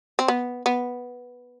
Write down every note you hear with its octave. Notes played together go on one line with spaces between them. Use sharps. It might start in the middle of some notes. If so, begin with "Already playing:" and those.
C4
B3
B3